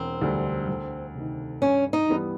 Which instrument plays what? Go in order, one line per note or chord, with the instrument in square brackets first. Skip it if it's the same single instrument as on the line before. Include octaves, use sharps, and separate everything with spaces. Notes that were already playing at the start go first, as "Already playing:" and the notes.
Already playing: [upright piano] E1 [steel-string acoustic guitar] C4
[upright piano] D2 D3 G3
D2
C3 D#3
[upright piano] G2 [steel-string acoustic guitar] C#4
[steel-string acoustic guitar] D#4
[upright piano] E3 G3 B3